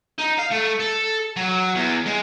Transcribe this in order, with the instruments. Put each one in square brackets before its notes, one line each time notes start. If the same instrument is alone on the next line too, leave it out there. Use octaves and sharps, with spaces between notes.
[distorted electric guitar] D#4
F5
A3
A4
F#3
E2
G#3